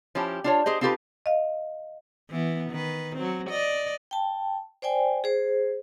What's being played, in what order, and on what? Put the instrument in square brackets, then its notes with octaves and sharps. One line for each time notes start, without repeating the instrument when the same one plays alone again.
[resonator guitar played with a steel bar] F3 C#4 E4 G4
D4 F4 C#5
G4 G#4 C5 D#5
C4 D#4 F4 G4 A4 B4
[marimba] D#5 F5
[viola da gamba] E3 B3
D#3 B4
F#3 C4
D5 D#5
[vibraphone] G5 A5
C5 D5 G5 G#5
G#4 C5